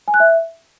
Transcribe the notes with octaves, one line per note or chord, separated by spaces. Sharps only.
G#5
F#6
E5